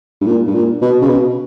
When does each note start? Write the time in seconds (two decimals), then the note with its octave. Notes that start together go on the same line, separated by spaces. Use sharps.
0.21 G2
0.26 A#2
0.47 G2
0.54 A#2
0.82 B2
1.02 C#3
1.09 B2